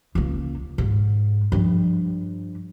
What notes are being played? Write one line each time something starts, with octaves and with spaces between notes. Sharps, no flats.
C#2 A#3
G#2
G2 F3